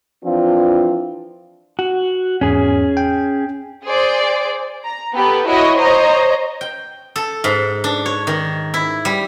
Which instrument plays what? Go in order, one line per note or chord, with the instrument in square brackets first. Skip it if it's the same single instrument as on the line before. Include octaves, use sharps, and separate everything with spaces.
[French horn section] E3 F3 C4 D4 F4
[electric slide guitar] F#4
[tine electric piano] E2 G#2 [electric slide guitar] C#4 G#4
[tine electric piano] G5
[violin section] G#4 C5 D5
A#5
B3 G4 A4 B4
E4 F#4 C#5 D#5
C5 C#5 D#5 A#5
[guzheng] G5
A4
G#2
D4
C#5
D#3
E4
G3